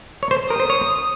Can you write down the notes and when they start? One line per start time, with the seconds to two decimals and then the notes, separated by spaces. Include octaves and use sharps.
0.23 C#5
0.31 C5
0.50 A#4 D#6
0.60 C5
0.70 C#5